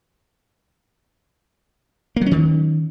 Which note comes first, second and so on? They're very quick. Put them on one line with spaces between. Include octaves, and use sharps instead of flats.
A#3 F#3 C#4 D#3